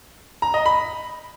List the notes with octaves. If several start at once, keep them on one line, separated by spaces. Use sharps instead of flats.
A#5
D#5
B5